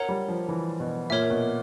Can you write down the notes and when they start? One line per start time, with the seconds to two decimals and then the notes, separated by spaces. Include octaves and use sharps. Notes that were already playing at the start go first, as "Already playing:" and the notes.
Already playing: A#4 C#5 F#5 A#5
0.09 G3
0.28 F3
0.49 E3
0.80 B2
1.10 A#2 A#4 C#5 E5
1.30 B2